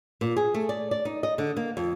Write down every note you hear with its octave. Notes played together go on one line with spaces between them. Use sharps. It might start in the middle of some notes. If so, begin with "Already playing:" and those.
A#2
G#4
A3
D5
D5
D#4
D#5
D3
A#3
F2